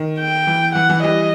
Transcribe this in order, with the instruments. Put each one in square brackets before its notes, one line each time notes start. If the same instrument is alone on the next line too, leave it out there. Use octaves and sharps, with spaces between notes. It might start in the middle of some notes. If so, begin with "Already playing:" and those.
Already playing: [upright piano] D#3
[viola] G5
[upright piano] E3
[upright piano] E3 [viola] F#5
[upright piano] E3
[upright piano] E3 G3 [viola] D#5